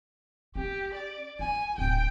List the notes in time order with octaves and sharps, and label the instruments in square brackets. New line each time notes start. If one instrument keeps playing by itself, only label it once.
[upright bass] C#4 [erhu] G4
[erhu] D5
[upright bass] F4 [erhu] G#5
[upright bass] D1 [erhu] G5